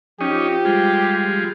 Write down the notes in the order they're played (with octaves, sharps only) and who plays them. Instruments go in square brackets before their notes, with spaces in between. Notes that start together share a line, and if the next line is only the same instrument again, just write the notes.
[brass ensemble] F3 [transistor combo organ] C#4 D#4 [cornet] G4
[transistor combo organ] G3 G#3 F4